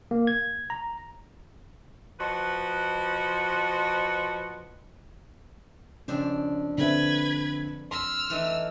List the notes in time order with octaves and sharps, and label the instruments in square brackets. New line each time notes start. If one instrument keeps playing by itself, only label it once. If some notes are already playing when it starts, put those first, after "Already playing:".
[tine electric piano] A#3
G#6
A#5
[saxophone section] F3 F#4 B4 D#5
[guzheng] F2 D4 C5 [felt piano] C#3
[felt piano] D3 C4 E5 [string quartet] B4 G#6
[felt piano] C6 [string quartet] E6 F6
[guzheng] E3 A3 D#4